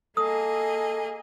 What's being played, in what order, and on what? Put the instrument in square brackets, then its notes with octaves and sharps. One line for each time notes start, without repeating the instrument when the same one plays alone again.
[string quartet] A#3 G#4 D#5 [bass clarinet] A4 [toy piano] D#6